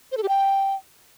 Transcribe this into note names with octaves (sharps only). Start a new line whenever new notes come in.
C5
A4
G4
G5